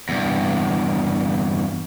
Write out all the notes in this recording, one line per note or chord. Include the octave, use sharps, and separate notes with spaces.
E2 G2